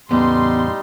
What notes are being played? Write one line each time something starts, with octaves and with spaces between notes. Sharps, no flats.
E2 A2 G3 B3 D#4 C6